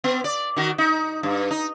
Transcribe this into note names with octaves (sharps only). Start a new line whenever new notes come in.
B3
D5
D#3 F#4
D#4
G2
D#4